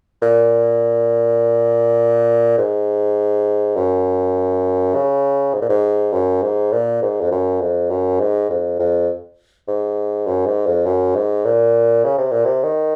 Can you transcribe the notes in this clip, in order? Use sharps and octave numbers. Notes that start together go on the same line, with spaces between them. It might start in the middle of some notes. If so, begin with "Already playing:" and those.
A#2
G#2
F#2
C#3
G#2
A#2
G#2
F#2
G#2
A#2
G#2
F2
F#2
F2
F#2
G#2
F2
F2
G#2
F#2
G#2
F2
F#2
G#2
A#2
C#3
C3
A#2
C3
D#3